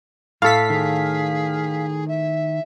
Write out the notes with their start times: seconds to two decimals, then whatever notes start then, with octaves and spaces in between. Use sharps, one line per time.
0.42 A2 A4 F5 B6
0.70 D#3 G#4
2.07 E5